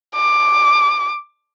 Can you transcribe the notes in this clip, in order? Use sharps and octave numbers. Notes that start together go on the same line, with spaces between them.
D6